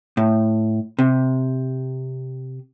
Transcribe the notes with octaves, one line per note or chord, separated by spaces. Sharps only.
A2
C3